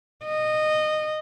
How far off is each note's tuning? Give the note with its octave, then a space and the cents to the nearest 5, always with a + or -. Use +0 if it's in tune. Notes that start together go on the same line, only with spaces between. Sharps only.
D#5 -20